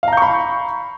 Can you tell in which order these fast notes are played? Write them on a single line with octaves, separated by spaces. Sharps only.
F5 A#5 G6 C#6 B5